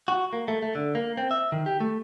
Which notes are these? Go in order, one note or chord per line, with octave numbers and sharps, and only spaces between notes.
F#4
A#3
A3
A3
D3
A#3
C4
E5
D#3
G4
A3